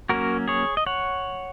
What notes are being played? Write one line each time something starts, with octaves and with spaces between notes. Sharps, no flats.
F#3 A#3 C#4 F#4 A#4
G#4 C#5
D#5
C#5 F#5